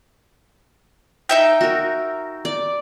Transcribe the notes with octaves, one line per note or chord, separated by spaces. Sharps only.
D#4 E5 G5
F#4 A#4
D5